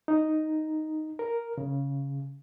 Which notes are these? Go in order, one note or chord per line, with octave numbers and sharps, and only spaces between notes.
D#4
A#4
C#3